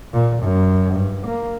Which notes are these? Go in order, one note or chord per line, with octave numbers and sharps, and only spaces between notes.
A#2
F#2
G2
A#3